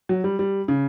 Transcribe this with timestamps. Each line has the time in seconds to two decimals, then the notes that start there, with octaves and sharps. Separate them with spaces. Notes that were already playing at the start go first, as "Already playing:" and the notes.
0.09 F#3
0.24 G3
0.39 G3
0.68 C#3